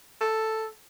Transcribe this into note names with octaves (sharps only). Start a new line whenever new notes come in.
A4